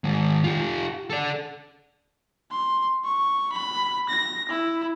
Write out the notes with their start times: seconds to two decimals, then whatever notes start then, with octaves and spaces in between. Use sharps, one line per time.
0.04 D#3 G#3
0.44 F4 G4
1.10 A4 D5
2.52 C6
3.05 C#6
3.53 B5
4.09 A#6
4.49 E4